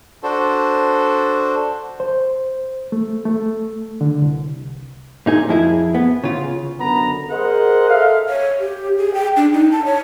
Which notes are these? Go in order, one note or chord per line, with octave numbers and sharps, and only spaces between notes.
D4 F#4 A4 C5
C5
A3
A3
D3
C2
A#2 D#4 G#4
F2 E4 G#4
B3
C#3 F4
F#2 D3 B3 A#5 B5
G#4 A#4 C5 D#5 F#5
A4 E5 F5
C#5
G4
G#4
G5
D4
D#4
A5
C#5